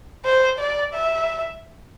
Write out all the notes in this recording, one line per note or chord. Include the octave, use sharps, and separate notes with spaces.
C5
D5
E5